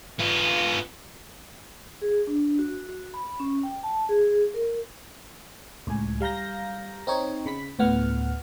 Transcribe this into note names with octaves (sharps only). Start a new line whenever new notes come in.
B3 F4
G#4
D4
F#4
F#4
B5
C#4
G5
A5
G#4
A#4
C#2 A2 G#5
G3 F5 A#5 G6 A#6
C4 D#4 C#5
C#3 B5 B6
D2 A2 B3 F#5 F6